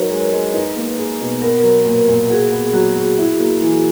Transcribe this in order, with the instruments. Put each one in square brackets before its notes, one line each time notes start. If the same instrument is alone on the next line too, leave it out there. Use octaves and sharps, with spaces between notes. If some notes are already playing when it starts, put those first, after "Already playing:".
Already playing: [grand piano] F#3 D#4 F#4 [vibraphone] A#4 B4 C#5
[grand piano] G#3
G#3
[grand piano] D#4 [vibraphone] B4
[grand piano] A#3
G#4
B2
[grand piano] B3 [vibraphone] A#4
[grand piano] F#3
A#2
A#2
[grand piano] F#4 [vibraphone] G#4
[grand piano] B3
[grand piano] F#3 [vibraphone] F#4
[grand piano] F#3
E4
A#3
E3